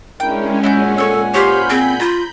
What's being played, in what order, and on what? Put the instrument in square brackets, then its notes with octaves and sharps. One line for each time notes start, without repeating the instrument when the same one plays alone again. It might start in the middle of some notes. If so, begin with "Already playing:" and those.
[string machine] G#3 C#4 [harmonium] D4 E4 A#4 [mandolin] G5
[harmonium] A#2 F#5 G#5 [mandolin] E4 F#4 G6
[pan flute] A4 [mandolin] C#5 E6
[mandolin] F4 C5 C#5 [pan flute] G4 [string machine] B5 G6
[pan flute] C4 [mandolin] G#4
[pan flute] F4 [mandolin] A#5